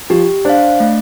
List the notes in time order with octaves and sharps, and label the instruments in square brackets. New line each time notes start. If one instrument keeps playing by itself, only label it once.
[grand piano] F3 [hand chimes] G4
[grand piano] D4 [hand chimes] C5 F5
[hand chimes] A3